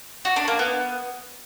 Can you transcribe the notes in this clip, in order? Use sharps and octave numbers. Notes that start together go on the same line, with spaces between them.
F#4
D4
A#3
B3